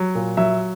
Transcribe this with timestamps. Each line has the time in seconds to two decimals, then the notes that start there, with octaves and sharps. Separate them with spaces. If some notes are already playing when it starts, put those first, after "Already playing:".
Already playing: F#3
0.15 A#2
0.37 F#3 E5